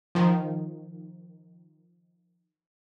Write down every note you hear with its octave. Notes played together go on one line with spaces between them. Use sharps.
D#3 F3